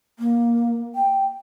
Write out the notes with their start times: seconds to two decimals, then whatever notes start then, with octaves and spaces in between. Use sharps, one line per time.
0.19 A#3
0.95 G5